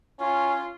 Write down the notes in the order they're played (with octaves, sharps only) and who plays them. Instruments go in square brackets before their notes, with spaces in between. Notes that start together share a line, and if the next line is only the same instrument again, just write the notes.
[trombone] C#4 [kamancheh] F4